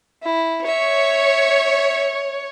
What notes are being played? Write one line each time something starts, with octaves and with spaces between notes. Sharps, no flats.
E4
C#5 E5